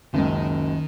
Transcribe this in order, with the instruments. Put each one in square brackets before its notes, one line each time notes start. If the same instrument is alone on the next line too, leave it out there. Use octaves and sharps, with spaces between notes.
[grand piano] F#1 C#2 [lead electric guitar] D#3